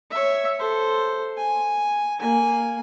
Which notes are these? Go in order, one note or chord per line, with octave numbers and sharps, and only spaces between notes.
C#5 E5
A4 C5
G#5
A#3 G#5